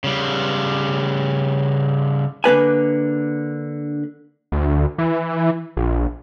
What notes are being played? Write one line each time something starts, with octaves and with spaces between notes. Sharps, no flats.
C#3 G3
D3 A#3 B4 G#5
D2
E3
A#1